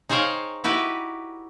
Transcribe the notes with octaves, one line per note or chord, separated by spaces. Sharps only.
D#4 G#4 C5 C#5 F5 G5
D#4 E4 F#4 G4 B4